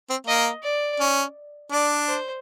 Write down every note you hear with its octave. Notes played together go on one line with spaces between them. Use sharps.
C4
A#3 D#5
D5
C#4
D4 D5
C5